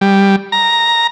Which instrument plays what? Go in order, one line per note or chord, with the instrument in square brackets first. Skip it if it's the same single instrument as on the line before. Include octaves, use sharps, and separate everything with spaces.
[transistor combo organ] G3
A#5